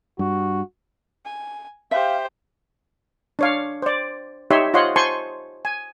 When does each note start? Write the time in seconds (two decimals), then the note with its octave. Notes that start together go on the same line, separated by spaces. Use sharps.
0.19 G2 F#4
1.25 G#5
1.91 G4 C5 E5 F5
3.39 D4 C#5 F5
3.82 C5 D5
4.50 D#4 G4 C#5 E5 C6
4.74 F4 C5 C#5 D#5 F#5 C6
4.96 C5 G#5 A5 C6 C#6
5.65 G#5